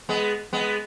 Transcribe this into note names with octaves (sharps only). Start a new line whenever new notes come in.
G#3 B3
G#3 B3